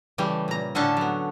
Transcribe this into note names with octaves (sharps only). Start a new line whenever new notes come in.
C#3 E3 G3 A3
A#2 A#5
A2 D3 C#4 D4 A4 A5
F#3 B3